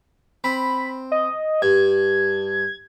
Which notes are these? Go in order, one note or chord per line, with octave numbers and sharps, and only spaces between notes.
C4 B5
D#5
G2 G#6